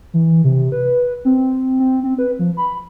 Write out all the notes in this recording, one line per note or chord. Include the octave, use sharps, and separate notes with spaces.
E3
C3
B4
C4
C4
C4
B4
F3
B5